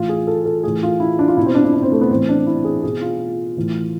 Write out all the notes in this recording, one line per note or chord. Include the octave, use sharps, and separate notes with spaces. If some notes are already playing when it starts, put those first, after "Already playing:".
Already playing: A2 E3 F4
G#4
A4
A4
A2 E3 G#4
F4
E4
D4
F4
B2 E4
C4
D4
E4
D4
C4
A3
B3
A2 E3 C4
D4
E4
G#4
B2 G#4
F4
A2 E3